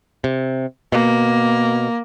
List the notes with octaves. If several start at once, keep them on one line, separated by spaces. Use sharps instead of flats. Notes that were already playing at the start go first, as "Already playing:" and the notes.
C3
B2 A#3